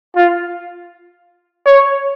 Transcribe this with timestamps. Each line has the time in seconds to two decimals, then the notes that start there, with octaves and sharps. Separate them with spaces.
0.16 F4
1.66 C#5